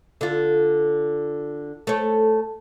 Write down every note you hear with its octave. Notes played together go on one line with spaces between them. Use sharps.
D3 F4
A3 C#5